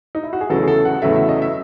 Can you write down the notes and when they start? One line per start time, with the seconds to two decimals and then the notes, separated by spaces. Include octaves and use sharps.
0.15 D#4
0.23 E4
0.33 F#4
0.41 G#4
0.50 E2 C#3 F#3 A3 A4
0.63 G#4
0.68 A4
0.85 F#5
1.02 E2 C#3 F#3 A3 E5
1.16 E5
1.29 D#5
1.42 E5